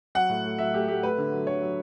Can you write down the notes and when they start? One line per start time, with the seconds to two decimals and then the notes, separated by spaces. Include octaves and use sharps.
0.15 F#3 F#5
0.29 A2
0.44 A3
0.58 F#3 E5
0.73 A3 G4
0.88 A3 G4
1.03 A3 B4
1.18 D3
1.32 F#3
1.47 D3 C#5
1.61 F#3